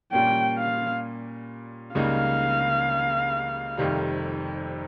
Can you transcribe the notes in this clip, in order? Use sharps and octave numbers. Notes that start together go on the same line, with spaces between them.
A#2 G3 A#3 C#4 G5
F5
C#2 C#3 G3 A#3 D#4 F5
F1 F2 C3 D#3 G3